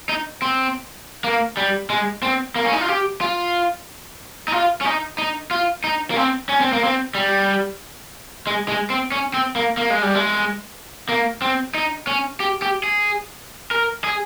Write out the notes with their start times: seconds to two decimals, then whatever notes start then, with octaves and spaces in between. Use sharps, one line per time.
0.09 D#4
0.42 C4
1.24 A#3
1.57 G3
1.90 G#3
2.23 C4
2.56 A#3
2.65 C#4
2.73 D#4
2.81 F4
2.89 G4
3.21 F4
4.48 D#4
4.52 F4
4.81 C#4
4.85 D#4
5.18 D#4
5.51 F4
5.84 D#4
6.11 A#3
6.16 C4
6.49 C#4
6.61 C4
6.73 A#3
6.84 C4
7.15 G3
8.47 G#3
8.69 G#3
8.90 C4
9.12 C#4
9.34 C4
9.56 A#3
9.77 A#3
9.90 G#3
10.02 G3
10.15 G#3
11.09 A#3
11.42 C4
11.75 D#4
12.07 C#4
12.40 G4
12.62 G4
12.83 G#4
13.71 A#4
14.04 G#4